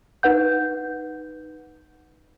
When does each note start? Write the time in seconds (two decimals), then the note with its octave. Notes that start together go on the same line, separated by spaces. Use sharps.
0.23 D#4 B4 F#5 G6